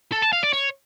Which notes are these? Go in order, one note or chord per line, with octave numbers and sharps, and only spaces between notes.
A4
A5
F5
D5
C#5